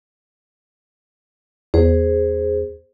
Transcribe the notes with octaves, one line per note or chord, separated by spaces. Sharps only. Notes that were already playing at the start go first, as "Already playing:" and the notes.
E2 G#4 C5